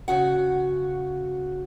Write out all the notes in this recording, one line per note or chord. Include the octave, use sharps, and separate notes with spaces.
C#3 F#4 F#5